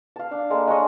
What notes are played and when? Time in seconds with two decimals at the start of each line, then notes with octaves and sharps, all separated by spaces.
0.16 F5 A5
0.31 D4
0.50 G#3 A#3 A4
0.67 G#3 D4 C#5 D#5